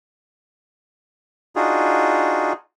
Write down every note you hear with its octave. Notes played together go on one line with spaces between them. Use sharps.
D4 D#4 F4 F#4 G#4